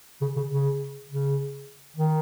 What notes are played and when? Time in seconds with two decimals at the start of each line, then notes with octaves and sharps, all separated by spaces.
0.21 C#3
0.36 C#3
0.51 C#3
1.09 C#3
1.96 D#3